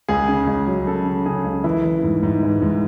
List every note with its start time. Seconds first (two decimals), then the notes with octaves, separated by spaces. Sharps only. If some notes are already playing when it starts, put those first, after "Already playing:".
0.08 C#2 G#4
0.29 C#3
0.48 C#2
0.67 F#3
0.87 C#3 A4
1.06 C#3
1.26 C#3 G#4
1.44 C#2
1.64 E3 E4
1.84 E3
2.03 G#2
2.23 G#2
2.43 E3
2.62 G#2